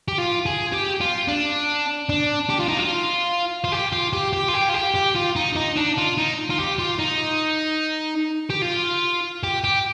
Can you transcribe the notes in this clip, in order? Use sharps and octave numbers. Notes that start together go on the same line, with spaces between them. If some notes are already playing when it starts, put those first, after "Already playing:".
G4
F4
G#4
G4
F4
D4
D4
G4
F4
D#4
F4
F4
G4
F4
G4
G4
F4
G4
F4
G4
G4
F4
D#4
D#4
D4
F4
D#4
F4
G4
F4
D#4
G4
F4
G4
G4